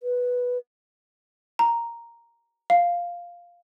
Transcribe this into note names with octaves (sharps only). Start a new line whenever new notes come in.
B4
A#5
F5